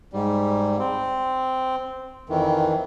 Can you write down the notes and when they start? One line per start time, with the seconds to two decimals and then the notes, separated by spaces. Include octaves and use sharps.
0.13 G#2 G3
0.79 C4
2.30 F2 D#3 E3